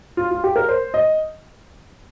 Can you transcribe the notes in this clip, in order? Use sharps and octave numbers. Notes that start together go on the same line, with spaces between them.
F4
F4
G4
A#4
C5
D#5